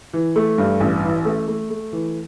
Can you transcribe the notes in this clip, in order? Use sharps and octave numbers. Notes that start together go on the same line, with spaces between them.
E3
A3
G2
A1
E3
A3
A3
A3
E3